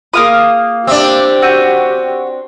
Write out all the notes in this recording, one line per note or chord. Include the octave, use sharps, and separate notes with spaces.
A#3 F4 G#4 F5 D#6
C4 D4 G4 E5 D6 E6
F#4 E6 G6 D#7